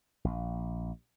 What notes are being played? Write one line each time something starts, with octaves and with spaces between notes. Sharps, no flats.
A#1